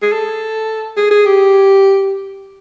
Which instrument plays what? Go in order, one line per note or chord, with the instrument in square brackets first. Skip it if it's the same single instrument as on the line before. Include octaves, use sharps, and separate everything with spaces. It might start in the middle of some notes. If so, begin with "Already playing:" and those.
[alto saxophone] G#4
A4
G#4
G#4
G4